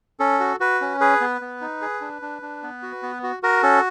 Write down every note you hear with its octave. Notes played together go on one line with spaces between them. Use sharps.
C#4 A4
F#4
F#4 B4
C#4
G#4 B4
B3
B3
D#4
G#4
D4
D4
D4
B3
F#4
B3
F#4
F#4 A#4
C#4 A4